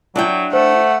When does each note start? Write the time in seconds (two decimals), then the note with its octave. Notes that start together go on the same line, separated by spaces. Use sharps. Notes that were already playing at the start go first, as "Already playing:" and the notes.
0.16 F#3 D4 E4 G5
0.53 A3 C5 F#5